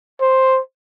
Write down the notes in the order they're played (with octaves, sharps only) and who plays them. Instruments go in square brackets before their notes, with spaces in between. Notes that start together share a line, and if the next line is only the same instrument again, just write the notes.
[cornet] C5